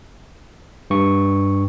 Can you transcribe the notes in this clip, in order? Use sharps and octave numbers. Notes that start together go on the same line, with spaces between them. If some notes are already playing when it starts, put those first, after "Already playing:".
G2 C#6